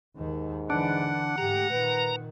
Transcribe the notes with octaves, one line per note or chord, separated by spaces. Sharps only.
D#2 G#2 D#3
D3 E3 D4 F#5
G#2 A3 G4 A#5
A#2 D#3 B4